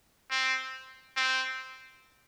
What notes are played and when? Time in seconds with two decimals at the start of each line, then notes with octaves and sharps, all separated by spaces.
0.31 C4
1.17 C4